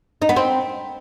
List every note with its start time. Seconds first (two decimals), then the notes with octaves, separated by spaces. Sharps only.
0.22 D#4
0.29 B3
0.36 C4